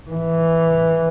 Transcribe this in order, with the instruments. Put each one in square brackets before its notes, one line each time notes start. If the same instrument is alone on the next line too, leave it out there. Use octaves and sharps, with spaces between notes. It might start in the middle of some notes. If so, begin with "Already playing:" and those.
[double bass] E3